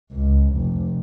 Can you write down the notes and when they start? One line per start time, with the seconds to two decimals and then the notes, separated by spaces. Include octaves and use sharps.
0.13 C#2
0.55 F1